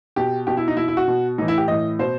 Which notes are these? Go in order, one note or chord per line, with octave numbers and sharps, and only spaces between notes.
B2 G4
B2 G4
E4
D#4
B2 E4
E4
F#4
B2
A2 E3 D#4
E4
G4
A2 E3 D#5
B2 C5